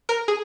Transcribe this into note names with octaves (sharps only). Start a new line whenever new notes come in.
A#4
G#4